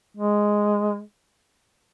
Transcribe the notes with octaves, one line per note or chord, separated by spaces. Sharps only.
G#3